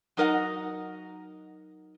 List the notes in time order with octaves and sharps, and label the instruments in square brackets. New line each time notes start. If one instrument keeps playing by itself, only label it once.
[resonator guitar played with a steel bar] F#3 D#4 A#4 D#5 F#5